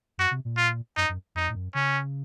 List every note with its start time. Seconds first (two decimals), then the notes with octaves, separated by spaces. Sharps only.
0.18 F#2 F#4
0.31 C3
0.45 A#2
0.57 F4
0.96 F#2 D#4
1.09 F#2
1.35 F2 D#4
1.50 A2
1.55 F#2
1.75 C#3 C#4